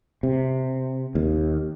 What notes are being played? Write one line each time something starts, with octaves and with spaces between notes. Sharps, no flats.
C3
D#2